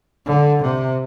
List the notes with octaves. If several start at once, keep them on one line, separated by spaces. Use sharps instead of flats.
D3
C3